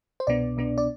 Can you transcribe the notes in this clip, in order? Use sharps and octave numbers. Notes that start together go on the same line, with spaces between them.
C5
C2 B2 B3 D4 D5
C2 B2 B3 D4
D5